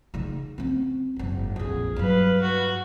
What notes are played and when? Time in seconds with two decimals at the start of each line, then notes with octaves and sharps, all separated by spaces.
0.14 C#3 D#4
0.58 C4 C#4
1.16 F#1 G#2
1.56 A#1 F2 G#4
1.96 G2 F#3 B4 F5
2.42 F#4